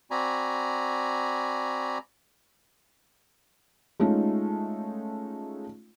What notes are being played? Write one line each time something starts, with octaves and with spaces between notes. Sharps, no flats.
C4 F#4 D5 G#5 A#5 B5
G#3 A3 C#4 D#4 F4